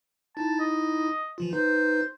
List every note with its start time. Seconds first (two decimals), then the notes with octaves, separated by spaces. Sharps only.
0.37 D#4 E4 A5
0.60 D#5
1.38 E3 F3 F4
1.53 D#4 B4 C5